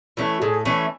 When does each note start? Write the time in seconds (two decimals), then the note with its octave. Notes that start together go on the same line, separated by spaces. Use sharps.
0.17 E3 A3 C#4
0.38 F#4
0.41 A2 G#4
0.65 E3 A3 C#4